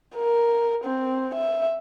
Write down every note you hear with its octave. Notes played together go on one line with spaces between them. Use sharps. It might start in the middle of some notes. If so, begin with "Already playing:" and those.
A#4
C4
E5